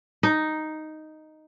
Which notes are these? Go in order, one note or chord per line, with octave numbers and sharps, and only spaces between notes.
D#4